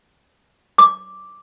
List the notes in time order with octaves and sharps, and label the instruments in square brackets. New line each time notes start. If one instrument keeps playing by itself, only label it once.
[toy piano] D6